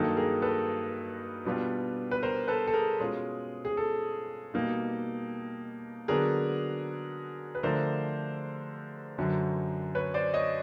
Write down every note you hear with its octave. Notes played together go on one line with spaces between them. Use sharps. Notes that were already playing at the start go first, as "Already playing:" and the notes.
Already playing: G2 D#3 F#3 A#3 D#4 A4
G#4 A#4
A4 B4
B2 G3 B3 D4 F4
B4
A#4 C5
A4 B4
A4
G#4 A#4
B2 G#3 C#4 F4 G#4
G#4
A4
B2 G3 A#3 D#4
D3 F#3 B3 D4 G#4 A#4
B4
D3 F3 A3 D4 A#4 C5
F#2 D3 F#3
B4 C#5
C5 D5
C#5 D#5